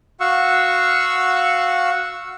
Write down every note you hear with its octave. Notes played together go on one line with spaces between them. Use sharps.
F#4 F5 F#5 C#6 E6